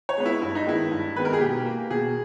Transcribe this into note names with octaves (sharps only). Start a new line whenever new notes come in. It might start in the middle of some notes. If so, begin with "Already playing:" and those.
C#5
G#3 B3
E4
G2 E4
D#4
D#3 G#3 B3 E4
G2
D#3 G#3 B3 B4
A#4
G#4
B2 G4
A#3
B2 G#4